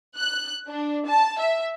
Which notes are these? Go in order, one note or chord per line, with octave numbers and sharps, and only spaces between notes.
F#6
D4
A5
E5